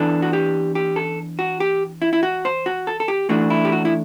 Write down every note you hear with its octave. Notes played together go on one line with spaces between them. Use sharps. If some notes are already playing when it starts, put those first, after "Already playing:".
Already playing: E3 B3 D4 A4
F#4
G4
G4
A4
F#4
G4
E4
E4
F#4
C5
F#4
A4
A4
G4
E3 A3 D4 F#4
E4
G4
F#4
E4